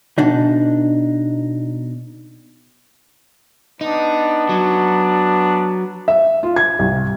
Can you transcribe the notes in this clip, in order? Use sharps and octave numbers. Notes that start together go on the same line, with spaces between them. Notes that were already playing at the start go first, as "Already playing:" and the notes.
B2 D4 D#4
B3 D4 D#4
F#3
E5
F4
G#6
C2